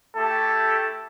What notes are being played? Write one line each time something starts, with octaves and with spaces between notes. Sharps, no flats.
A3 E4 G4 A4